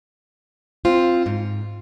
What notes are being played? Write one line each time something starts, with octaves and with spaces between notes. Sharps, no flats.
C4 F4
G#2